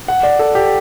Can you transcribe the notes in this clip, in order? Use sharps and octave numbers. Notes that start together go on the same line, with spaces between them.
F#5
D5
A4
G4